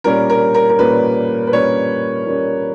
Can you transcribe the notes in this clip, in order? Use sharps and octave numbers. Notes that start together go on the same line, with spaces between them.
A#2 G3 A#3 C#4 A#4
A#4
A#4
A#4
A#2 G3 A#3 C#4 B4
B4
A#2 G3 A#3 C#4 C#5
A#2 G3 A#3 C#4